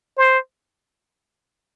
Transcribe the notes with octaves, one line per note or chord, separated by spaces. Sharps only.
C5